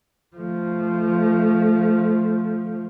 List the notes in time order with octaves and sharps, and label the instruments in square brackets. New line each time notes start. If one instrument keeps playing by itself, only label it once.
[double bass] F3 A3